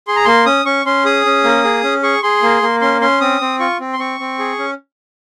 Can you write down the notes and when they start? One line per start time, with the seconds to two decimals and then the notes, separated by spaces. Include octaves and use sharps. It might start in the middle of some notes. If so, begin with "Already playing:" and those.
0.07 G#4 C6
0.16 A#5
0.25 A#3 C6
0.46 C#4 D#6
0.65 C#4 C#6
0.85 C#4 C6
1.05 G#4 D#6
1.25 C#4
1.44 A#3
1.64 G#4
1.84 C#4
2.03 G#4 C#6
2.23 G#4 C6
2.42 A#3
2.62 A#3
2.81 C#4 C6
3.01 C#4 C6
3.21 C4 D#6
3.41 C4
3.60 F4 C#6
3.80 C4
3.93 C6
3.99 C4 C#6
4.20 C4
4.39 G#4
4.59 C#4